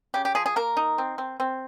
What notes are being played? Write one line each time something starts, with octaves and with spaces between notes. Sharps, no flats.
C#3 G4
G4
F3 G#4
G#4
A#3 A#4
D#4
C4
C4
C4